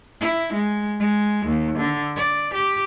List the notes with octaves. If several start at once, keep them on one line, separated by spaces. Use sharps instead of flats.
E4
G#3
G#3
D#2
D3
D5
G4